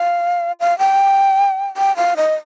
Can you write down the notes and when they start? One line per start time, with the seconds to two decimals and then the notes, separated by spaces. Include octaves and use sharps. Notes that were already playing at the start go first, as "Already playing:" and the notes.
Already playing: F5
0.60 F5
0.79 G5
1.77 G5
1.97 F5
2.17 D#5